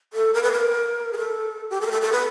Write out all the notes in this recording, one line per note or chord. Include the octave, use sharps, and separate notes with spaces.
A4
A#4
B4
A#4
G#4
A4
G4
A4
A#4
A4
A4
B4